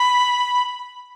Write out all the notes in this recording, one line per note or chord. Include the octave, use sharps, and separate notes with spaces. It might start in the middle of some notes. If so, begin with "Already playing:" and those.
Already playing: B5